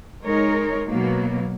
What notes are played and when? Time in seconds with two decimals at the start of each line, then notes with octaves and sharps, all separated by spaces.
0.25 G#3 D#4 A#4 C#5
0.87 B2 F#3 A#3